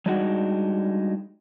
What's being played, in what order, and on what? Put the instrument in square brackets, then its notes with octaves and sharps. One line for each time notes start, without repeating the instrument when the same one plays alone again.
[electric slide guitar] G3 G#3 D4 D#4 F#4 F#5